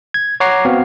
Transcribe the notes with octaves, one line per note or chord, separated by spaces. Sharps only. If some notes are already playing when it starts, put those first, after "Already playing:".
G#6
C#5 F#5 A#5 D6 C7
B3 C4 F#4 F5